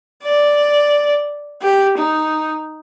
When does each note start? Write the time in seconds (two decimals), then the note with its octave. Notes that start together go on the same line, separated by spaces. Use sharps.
0.23 D5
1.61 G4
1.97 D#4